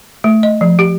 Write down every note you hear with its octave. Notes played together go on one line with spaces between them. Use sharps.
A3
D#5
F3
G4